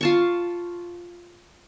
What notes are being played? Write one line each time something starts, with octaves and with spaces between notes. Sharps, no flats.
F4 A5 C#6